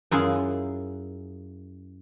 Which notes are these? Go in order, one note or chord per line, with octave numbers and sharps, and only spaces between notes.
F#2 E4 F4 G#4